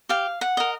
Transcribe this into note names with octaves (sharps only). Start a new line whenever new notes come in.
G4 F5
F#5
A#4 D#5